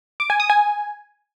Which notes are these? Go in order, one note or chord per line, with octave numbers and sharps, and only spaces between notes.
D6
G#5
D#6
G#5